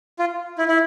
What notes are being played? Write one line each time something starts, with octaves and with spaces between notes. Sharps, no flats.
F4
E4
E4